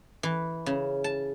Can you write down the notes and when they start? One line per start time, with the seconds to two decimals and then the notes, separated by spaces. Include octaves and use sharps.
0.23 E3
0.66 C#3
1.04 A5